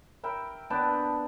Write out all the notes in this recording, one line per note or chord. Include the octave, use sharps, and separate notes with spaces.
A#4 E5 G5 B5
B3 D4 G5 A5